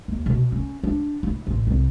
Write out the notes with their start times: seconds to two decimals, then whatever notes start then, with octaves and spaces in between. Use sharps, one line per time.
0.08 D#2
0.26 B2
0.52 C#4
0.84 D4
1.23 E4
1.47 A1
1.67 C2